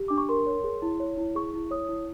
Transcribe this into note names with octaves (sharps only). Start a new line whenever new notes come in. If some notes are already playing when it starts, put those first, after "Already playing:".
Already playing: G4
D4 D6
C#6
A#4 C6
C#5
G#4
E4
C#5
E4
G#4 C#6
E4
C#5 D#6
E4